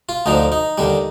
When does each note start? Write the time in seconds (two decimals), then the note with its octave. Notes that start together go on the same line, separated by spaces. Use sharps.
0.09 F4
0.26 D2 D3 F3 D#4
0.52 D#4
0.78 D#2 D3 G3